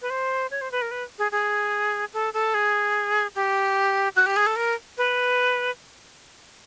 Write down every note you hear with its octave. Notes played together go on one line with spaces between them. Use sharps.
B4
C5
C#5
C5
B4
A#4
B4
G#4
G#4
A4
A4
G#4
G4
F#4
G4
G#4
A4
A#4
B4